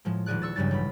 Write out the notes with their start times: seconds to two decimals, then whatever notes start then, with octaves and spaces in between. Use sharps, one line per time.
0.05 A2 F3 G#3
0.26 D#1 F3 G#4 D5 F#6
0.42 C#6 E6 A6
0.56 E1 B1 G2 C#3 G3 A6
0.71 A1 B5